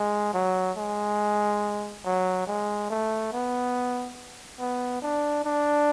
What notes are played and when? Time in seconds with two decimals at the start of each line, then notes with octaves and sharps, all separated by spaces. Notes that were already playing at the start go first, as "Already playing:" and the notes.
Already playing: G#3
0.33 F#3
0.77 G#3
2.05 F#3
2.47 G#3
2.90 A3
3.33 B3
4.59 B3
5.02 D4
5.44 D4